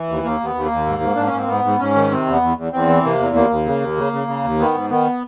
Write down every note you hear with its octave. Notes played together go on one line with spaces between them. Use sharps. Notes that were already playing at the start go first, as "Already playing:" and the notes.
Already playing: E3
D#2
D#2 A#3
D#2 B3
D#2
A#3
D#2
G#2
G#2
G#2 D4
C#4
G#2 C4
G#2 B3
G#2
G#2 C#4
D#3
C3 C4
E2 B3
E2
E2
E2 C4
E3
C3 A#3
E2
D#2 A#3
D#2
C#3
D#2
C#3
C#3
C#3
D#2
D#3 B3
G#2
D#3 B3